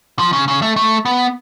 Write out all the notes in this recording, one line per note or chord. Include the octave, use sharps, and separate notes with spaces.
F3
C#3
C#3
A3
A3
B3